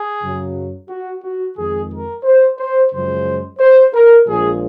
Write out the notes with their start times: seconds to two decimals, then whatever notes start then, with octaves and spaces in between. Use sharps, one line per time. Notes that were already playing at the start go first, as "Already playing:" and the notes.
Already playing: G#4
0.21 F#2 C#3 F#3
0.89 F#4
1.23 F#4
1.56 F2 D#3 G#3 G#4
1.91 A#4
2.24 C5
2.58 C5
2.91 F#2 C#3 F3 G#3 C5
3.59 C5
3.94 A#4
4.27 A#1 A#2 F3 G#3 G#4